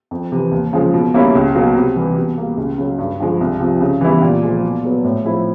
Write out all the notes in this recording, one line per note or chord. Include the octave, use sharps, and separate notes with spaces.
F2
C3 E3
D#2
C#3 F3 G#3
B2
G3 A#3 C#4 E4
C#2
B2 F#3 A#3
C3
E3 G3
B2
G3 A#3
C#2
C#3 F#3
G2
D3 F3 G#3
C2
C3 F3
C#3
E3 G3 B3 E4
A#2
F3 G#3
B2
F#3 B3
A2
F3 G#3 C4 E4